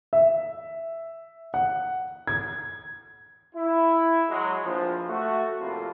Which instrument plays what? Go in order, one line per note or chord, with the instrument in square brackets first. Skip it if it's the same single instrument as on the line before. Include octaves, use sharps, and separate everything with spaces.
[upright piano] E5
F#5
G#6
[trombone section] E4
F#3 G#3
A#1 E2 F3
A3 F#4
F2 A2 C3 A#3 F4